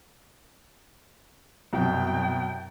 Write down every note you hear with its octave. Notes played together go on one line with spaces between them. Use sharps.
C2 F#2 B2 G5